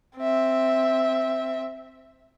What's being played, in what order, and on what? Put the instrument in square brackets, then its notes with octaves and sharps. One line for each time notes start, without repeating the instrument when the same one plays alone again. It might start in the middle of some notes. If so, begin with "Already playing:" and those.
[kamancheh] C4 E5